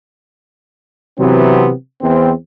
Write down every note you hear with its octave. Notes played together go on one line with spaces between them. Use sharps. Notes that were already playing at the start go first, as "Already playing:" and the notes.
C3 E3 F#3 B3 C4
E2 C4